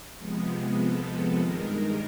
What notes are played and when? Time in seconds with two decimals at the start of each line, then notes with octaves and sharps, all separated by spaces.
0.17 C3 F3 G#3 B3
0.77 A4
1.38 G2 D#3 G#3 A#4